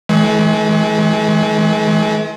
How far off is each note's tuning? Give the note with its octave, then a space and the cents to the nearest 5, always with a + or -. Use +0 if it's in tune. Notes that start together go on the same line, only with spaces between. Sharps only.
E3 -25 G#3 +40